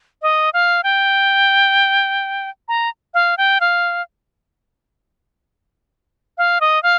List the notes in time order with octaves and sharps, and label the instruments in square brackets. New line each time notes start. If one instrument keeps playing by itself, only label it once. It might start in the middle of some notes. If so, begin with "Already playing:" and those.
[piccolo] D#5
F5
G5
A#5
F5
G5
F5
F5
D#5
F5